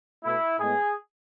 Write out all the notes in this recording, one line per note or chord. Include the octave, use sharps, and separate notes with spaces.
B2 A3 E4
A2 G#3 B3 G#4